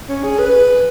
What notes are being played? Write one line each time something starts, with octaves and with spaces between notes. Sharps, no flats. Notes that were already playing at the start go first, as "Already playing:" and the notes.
C#4
G#4
B4